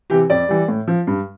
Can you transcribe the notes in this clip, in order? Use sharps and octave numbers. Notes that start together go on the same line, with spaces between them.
C3 E3 G4
F2 D5
E3 G3
A2
F3
G2